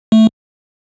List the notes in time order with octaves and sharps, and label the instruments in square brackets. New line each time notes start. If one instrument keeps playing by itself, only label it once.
[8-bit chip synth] A3